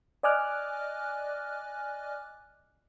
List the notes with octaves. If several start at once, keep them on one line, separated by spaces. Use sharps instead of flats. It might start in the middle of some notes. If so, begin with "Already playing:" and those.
D5 D#5 G#5 D6 F6 F#6